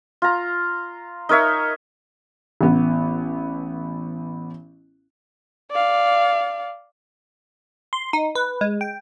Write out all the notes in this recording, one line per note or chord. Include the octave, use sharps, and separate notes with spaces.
F4 A#5
D#4 A#4 C#5 E5
A1 B3
D5 F5
C6
D#4
B4
G#3
G5